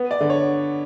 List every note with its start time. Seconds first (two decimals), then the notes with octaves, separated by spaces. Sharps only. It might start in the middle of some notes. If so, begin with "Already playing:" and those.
Already playing: B3
0.11 D5
0.21 D3
0.30 C#5